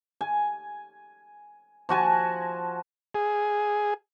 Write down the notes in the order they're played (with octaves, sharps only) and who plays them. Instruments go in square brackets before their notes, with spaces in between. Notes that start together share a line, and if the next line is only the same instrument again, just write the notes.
[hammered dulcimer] G#5
F3 F#4 G#5 A5
[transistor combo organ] G#4